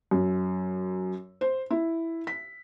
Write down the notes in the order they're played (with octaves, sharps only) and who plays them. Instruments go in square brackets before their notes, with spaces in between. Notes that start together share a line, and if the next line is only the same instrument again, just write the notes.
[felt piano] F#2
C5
E4
B6